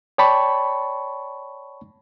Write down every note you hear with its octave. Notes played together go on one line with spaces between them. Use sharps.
C#5 D5 G5 A5 B5 C#6